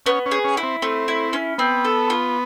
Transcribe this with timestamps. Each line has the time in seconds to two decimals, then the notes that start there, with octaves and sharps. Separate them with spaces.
0.06 B3 C#4
0.26 C#4
0.31 G#4
0.44 C#4
0.57 E4
0.63 C4
0.82 A3 C4
1.08 E4
1.33 C#4
1.58 B3 C4
1.85 A4
2.10 F4